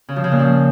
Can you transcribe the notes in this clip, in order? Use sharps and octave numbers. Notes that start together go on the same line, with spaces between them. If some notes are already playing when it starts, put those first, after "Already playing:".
C#3
F3
C#3
A#2
F3